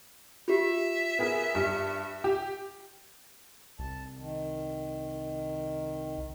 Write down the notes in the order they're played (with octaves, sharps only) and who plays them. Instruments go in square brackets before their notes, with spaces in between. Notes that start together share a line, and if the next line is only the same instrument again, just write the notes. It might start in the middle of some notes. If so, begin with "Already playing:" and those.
[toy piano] F4 G4 [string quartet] E5
[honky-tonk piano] B3 G#4 A#4
G2
G4
[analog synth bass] C2 [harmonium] A5
[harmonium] D#3